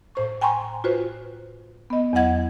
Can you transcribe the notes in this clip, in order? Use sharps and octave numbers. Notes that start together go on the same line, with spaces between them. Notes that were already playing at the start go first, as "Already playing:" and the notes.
A2 C5 C#6
G5 G#5 A#5 C6 C#6
F4 F#4 B4 C5
B3 D#5
E2 F#3 E4 D#5 F#5 G#6